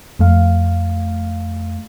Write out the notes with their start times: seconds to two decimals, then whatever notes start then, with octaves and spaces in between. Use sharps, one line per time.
0.19 F2 A3 F5